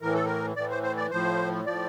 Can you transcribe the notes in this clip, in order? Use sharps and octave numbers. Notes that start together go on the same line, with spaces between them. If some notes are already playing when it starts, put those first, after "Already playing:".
A2 E3 A#4
A4
A#4
A2 E3 D5
C5
C5
D5
A2 F3 C5
A2 F3 D5